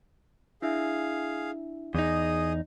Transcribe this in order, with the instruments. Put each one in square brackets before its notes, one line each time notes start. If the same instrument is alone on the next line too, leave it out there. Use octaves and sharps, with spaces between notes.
[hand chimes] D4 E4 E5 [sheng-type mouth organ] G#4 F5
[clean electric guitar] E2 D#4 [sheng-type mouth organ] G#4 D#5 D#6